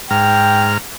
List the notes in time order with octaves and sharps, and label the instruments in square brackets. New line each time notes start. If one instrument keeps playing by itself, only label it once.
[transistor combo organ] G#2 A#5 F6 [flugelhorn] G5